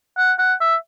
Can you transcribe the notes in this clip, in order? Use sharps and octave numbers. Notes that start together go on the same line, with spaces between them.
F#5
F#5
E5